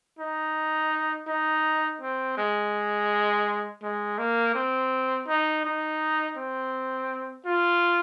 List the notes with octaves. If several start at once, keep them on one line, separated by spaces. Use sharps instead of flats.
D#4
D#4
C4
G#3
G#3
A#3
C4
D#4
D#4
C4
F4